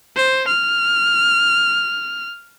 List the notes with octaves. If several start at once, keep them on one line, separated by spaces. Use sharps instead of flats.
C5
F6